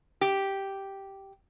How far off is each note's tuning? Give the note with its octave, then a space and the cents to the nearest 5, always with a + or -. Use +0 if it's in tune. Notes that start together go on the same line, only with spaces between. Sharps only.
G4 -5